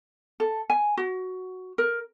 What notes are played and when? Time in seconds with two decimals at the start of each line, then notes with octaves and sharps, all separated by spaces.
0.40 A4
0.70 G#5
0.97 F#4
1.78 A#4